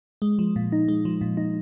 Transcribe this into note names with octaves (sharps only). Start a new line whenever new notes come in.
G#3
F3
A#2
D#4
G#3
F3
A#2
D#4